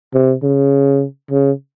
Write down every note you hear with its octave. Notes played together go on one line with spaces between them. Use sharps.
C3
C#3
C#3